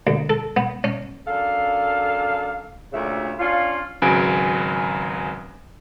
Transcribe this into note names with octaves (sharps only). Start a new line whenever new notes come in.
D2
A4
B3
C#4
F#2 D4 A4 F5
D2 A#2 C#3 A3 E5
C#4 D4 F4
G#1 C#3 F#3 B4 G#5 D7